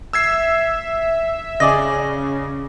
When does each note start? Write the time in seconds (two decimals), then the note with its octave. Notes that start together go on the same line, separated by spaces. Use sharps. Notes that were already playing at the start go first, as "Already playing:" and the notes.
0.13 E5 E6 G#6 C7
1.60 C#3 G#4 D5 D#5 A#6